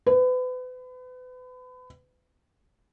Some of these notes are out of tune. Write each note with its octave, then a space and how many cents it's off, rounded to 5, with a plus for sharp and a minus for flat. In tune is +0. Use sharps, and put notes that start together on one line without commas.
B4 +35